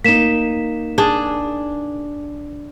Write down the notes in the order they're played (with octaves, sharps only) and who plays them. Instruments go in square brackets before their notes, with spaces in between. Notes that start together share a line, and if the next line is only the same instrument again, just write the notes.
[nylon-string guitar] A#3 D#4 [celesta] B6 E7
[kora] D4 G#4